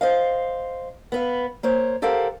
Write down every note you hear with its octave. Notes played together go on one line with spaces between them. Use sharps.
C5 D#5 F5
B3 B4 F5
A#3 C5 C#5
G4 A4 A#4 C5 F5 F#5